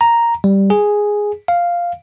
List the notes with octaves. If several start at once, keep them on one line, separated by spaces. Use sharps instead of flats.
A#5
G3
G#4
F5